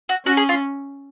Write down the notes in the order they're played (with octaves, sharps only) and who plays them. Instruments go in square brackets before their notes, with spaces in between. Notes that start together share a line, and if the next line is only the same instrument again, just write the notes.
[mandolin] F#4
[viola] C#4 [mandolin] F#4
[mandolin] G#4
F4